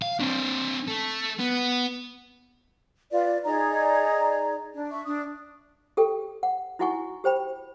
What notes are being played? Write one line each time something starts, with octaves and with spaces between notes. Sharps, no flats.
F5
C4 D4
A3
B3
F4 B4 D5
D#4 G#4 D5 A#5
D4
E5 C#6
D4 D#6
G4 A4 G5
F#5
D#4 E4 F#4 F#5 G#5 C#6
G4 C5 G5 B5